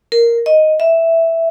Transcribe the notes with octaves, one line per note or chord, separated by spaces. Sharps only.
A#4
D#5
E5